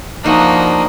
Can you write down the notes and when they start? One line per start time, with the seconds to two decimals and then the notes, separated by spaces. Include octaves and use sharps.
0.24 F3 A#3 D4 D#4 F#4 D#5